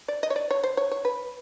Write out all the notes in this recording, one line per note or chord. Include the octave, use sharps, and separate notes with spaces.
D5
D#5
C#5
D5
C#5
C5
C#5
C#5
B4